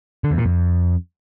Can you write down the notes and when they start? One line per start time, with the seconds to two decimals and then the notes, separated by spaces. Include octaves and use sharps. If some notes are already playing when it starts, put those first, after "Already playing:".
0.24 D3
0.31 E2
0.38 A#2
0.45 F2